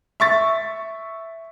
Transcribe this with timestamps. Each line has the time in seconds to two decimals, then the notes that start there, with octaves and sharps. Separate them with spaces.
0.20 E5 C#6 A6